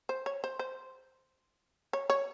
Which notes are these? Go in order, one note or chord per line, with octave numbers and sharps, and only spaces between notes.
C5
C#5
C5
C5
C#5
C#5